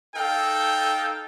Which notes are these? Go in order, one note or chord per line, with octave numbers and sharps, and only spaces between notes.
D#4 A4 F5 G5